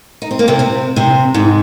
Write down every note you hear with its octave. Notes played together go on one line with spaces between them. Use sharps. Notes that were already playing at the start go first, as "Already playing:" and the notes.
D#4
C4
A#3
C3 C4
C3 C4
C3 C4
G#2 G#3